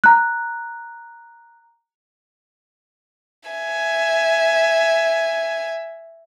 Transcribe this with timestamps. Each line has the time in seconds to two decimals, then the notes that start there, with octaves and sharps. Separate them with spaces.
0.04 A#5 F#6
3.49 E5 G#5